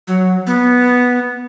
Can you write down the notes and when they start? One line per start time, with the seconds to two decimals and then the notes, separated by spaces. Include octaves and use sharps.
0.08 F#3
0.47 B3